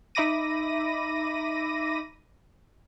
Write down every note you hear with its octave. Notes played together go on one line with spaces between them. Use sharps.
D#4 E5 B5 D6 A#6 D#7